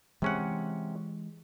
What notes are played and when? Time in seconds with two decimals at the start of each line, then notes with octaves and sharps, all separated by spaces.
0.22 C3 E3 G#3 C#4 F#5